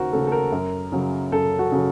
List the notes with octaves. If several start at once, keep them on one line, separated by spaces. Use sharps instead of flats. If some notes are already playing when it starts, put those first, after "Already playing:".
Already playing: D#2 C#3 F#4 A#4 C5
C#3 A3 A4
A4
A#4
F#2
C#3 F#3
F#2 A4
F#4
C#3 F#3